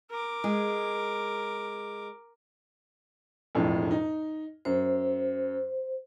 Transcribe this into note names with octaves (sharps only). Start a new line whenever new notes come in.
A#4 D6
G#3 G#4
E1 F2 A2
D#4
F#2 C5